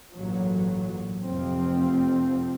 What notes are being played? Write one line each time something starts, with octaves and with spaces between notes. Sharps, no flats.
A1 G2 A#2 F#3
F1 F2 F3 C4